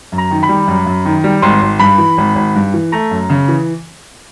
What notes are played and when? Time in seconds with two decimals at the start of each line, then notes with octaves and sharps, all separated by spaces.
0.12 F#2
0.18 A#5
0.31 D#3
0.43 B5
0.49 G3
0.67 F#2
0.86 F#2
1.05 D#3
1.24 G3
1.42 G#1 C6
1.62 G#1
1.79 G2 B5
1.98 E3
2.18 G#1
2.36 G#1
2.55 G2
2.74 E3
2.92 A3 A#5
3.11 F#2
3.30 C#3
3.48 E3